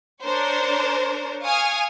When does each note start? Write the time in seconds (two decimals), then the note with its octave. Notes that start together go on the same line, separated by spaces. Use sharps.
0.23 D4 A#4 C5 C#5
1.44 F5 G#5 C#6 D#6 F6